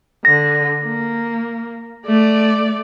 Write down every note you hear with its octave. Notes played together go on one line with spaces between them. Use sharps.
D3 A#6
A#3
A3 D5